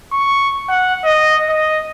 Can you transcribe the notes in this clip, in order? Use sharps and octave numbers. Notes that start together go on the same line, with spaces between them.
C#6
F#5
D#5
D#5